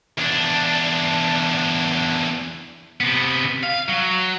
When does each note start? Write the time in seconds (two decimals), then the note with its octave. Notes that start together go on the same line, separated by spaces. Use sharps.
0.18 E2 D4
3.00 C3 B3
3.63 F5
3.88 F#3